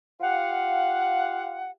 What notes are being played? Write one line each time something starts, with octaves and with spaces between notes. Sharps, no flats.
F4 G4 F5 F#5